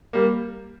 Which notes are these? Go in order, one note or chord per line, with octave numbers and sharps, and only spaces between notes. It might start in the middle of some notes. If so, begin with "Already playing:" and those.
G3 A#3